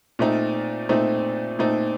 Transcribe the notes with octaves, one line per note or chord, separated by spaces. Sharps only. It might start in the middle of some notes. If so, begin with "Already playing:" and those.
A#2 A3 C4 D#4
A#2 A3 C4 D#4
A#2 A3 C4 D#4